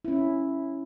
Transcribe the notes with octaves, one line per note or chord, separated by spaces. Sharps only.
C#4 E4